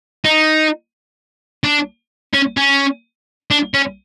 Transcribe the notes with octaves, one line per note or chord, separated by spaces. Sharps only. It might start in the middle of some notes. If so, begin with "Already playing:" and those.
D#4
D4
C#4
C#4
D4
C#4